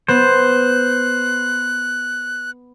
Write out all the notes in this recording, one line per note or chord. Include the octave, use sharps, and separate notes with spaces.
B3 C5 F#6